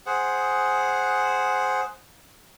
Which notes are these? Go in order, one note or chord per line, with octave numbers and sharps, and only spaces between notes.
G#4 C5 F#5